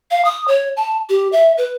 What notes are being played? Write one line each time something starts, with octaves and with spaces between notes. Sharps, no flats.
F5
D#6
C#5
A5
G4
E5
B4